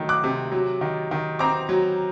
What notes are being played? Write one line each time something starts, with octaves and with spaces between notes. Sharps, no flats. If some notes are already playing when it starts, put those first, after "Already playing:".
Already playing: D#3 F#3 A3
D6 F#6
C3
F#3
D#3
D#3
C4 A#5 D6
F#3